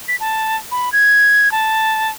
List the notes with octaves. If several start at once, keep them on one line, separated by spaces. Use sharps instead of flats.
B6
A5
B5
G#6
A5